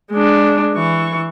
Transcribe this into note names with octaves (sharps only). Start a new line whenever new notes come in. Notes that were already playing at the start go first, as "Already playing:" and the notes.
G#3 D4
E3 C#6